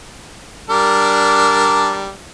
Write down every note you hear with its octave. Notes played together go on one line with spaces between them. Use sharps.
G3 D4 A#4